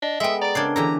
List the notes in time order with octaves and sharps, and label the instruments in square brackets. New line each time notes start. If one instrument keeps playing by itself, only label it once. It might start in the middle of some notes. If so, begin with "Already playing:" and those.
[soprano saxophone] D4 [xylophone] D#5
[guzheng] G#3 B3 [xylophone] A4 G5 [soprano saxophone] E5
[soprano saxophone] D5 [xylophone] A#5 D7
[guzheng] C#3 D4 [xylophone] A#4 G#6 C7
[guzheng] D3 E3 G4 [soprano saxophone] A#5